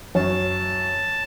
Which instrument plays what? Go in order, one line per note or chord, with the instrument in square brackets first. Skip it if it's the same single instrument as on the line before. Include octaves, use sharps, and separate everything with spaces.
[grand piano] F#2 [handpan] C#5 [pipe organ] A5